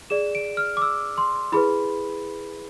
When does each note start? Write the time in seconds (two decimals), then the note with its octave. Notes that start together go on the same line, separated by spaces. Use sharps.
0.10 G#4 D5 E7
0.35 D7
0.57 F6
0.77 D6
0.82 E6
1.18 C6
1.52 E4 G#4 B4 B5